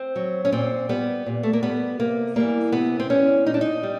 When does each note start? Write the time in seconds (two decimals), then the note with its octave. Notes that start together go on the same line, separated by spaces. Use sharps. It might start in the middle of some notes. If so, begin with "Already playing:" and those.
Already playing: C4
0.16 F#3
0.45 C#4
0.52 A#2 C4
0.89 G3 B3
1.26 A#2
1.43 A3
1.53 A#3
1.63 G3 B3
1.99 C3 A#3
2.36 E3 G3 A#3
2.72 C3 B3
3.00 C4
3.10 E3 G3 C#4
3.46 A#2 D#4
3.54 D4
3.61 D#4
3.83 G3